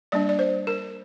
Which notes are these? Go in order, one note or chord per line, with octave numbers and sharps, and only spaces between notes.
G3 A#3 D4 D5
D5
C5
A#4